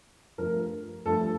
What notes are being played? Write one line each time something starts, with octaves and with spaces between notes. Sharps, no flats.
G2 F3 A3 A#4
G2 F3 A3 A4